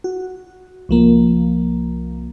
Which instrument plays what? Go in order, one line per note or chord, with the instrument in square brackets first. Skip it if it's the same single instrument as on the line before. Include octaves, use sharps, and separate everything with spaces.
[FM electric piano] F#4
C2 F3 A#3